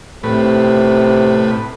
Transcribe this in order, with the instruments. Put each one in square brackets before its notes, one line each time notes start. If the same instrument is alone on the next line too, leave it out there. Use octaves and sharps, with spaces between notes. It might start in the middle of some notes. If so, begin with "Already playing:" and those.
[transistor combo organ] A2 B4 [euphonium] C3